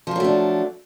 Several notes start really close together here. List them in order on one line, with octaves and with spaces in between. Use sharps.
F3 A#3 F#3 A3 D4